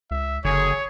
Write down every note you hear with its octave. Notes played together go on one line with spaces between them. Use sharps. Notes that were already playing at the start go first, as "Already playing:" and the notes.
C#2 E5
F#1 D3 G#4 C#5